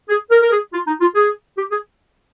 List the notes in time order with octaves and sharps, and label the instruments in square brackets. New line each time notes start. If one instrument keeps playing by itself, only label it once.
[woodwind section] G#4
A#4
A#4
G#4
F4
D#4
F4
G#4
G4
G#4